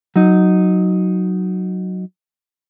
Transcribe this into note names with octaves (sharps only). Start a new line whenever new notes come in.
F#3 D#4